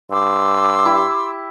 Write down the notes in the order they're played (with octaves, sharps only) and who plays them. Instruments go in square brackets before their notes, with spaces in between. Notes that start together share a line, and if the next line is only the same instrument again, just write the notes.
[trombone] G2 [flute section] C6 D6 E6
[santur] E4 G4